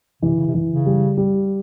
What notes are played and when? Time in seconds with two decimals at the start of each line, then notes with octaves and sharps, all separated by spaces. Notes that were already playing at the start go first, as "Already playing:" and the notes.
0.22 C3 E3
0.35 C#3
0.47 C3
0.54 E3
0.70 C#3
0.86 G3
1.17 G3